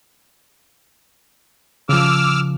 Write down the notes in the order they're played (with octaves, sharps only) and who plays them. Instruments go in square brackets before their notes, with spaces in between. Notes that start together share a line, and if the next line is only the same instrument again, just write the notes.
[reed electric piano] C#3 F3 [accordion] D6 E6 F6